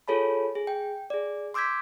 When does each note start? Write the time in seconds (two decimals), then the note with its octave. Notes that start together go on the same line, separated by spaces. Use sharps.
0.08 F4 G#4 A4 C#5 A5 B5
0.55 G#4
0.67 G5
1.10 G#4 D5
1.54 C6 D6 E6 G6 G#6 B6